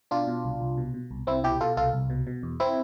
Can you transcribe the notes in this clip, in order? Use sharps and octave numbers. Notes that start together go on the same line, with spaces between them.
B2 D4 F4
B2
C2
C2
B2
B2
C2
C2 C4 E4
B2 E4 G4
B2 F4 A4
C2 F4 A4
C2
B2
B2
E2
C4 E4